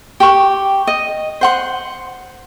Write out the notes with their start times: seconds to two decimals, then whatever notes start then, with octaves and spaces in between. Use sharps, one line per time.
0.20 G4 C#6 D6
0.87 D#5
1.41 C5 F#5 C6